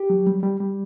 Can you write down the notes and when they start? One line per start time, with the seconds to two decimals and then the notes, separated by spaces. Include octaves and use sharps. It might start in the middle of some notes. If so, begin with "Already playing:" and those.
Already playing: G4
0.10 F#3
0.27 G3
0.43 G3
0.60 G3